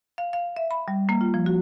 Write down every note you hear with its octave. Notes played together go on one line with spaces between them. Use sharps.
F5
F5
E5
B5
G3
A#3
F4
F3
F#4